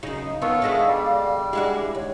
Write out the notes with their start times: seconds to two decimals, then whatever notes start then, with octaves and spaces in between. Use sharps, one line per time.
0.03 F#2 C#3 D#4
0.42 D#3 B3 F4 A4 C#5 F5
0.62 D3 G#3 B3 D#5 E5
0.88 G3 D5
1.53 G#3 D4 E4 F#4 G4
1.95 D#2 C#5